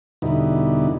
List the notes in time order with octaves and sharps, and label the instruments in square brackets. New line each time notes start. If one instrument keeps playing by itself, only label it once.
[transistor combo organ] E2 B2 D3 G3 D#4 E4